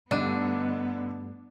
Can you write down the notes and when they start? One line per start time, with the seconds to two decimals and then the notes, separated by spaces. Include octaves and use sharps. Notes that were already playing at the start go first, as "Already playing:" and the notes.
0.11 G2 D3 G3 A3 B3 D4 D#4 D#7